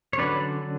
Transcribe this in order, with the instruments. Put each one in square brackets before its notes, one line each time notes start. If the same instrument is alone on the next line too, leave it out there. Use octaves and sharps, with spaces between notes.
[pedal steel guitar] C#5
D3 F#3 C#4 B4 D5